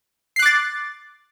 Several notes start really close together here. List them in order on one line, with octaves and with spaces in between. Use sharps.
C7 F#6 D6 A6